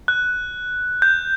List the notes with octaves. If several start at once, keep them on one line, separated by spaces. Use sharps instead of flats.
F#6
G6